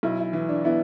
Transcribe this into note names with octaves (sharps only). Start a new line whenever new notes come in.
B1 E4
E4
E3
D4
B3 E4